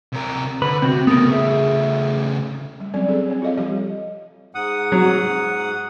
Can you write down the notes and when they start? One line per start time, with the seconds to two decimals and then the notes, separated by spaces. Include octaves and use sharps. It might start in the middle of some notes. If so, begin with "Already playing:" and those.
0.13 C3 A#4
0.62 D3 B4
0.82 C3 C4 F#4
1.07 C#3 A3 B3 A#4
1.28 G#4 E5
2.80 G3
2.94 F#3 C4 C#4 D5
3.07 C4 D4 G#4 A4
3.28 C4 C#5
3.42 F4 A4 D#5 F5
3.58 F3 G3 G4 D#5
4.55 G#2 F#5 D#6
4.92 F#3